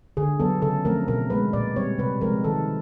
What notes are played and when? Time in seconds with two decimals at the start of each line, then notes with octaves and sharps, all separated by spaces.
0.17 D3 G#4
0.40 F#3 B3 A4
0.62 C#3 A4
0.85 F3 A3 C4 A#4
1.08 B2 A#4
1.30 G#3 B3 B4
1.53 A#2 D5
1.76 G3 C4 C#5
1.98 C3 B4
2.21 F3 G#3 C4 A#4
2.44 D#3 A4